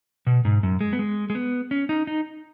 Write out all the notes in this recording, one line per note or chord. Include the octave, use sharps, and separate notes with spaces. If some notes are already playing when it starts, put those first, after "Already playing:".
B2
G#2
F#2
G#3
B3
G#3
G#3
B3
C#4
D#4
D#4